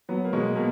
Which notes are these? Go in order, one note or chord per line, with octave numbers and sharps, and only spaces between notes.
F#3 B3
A#3
B2 G#3
B2 A#3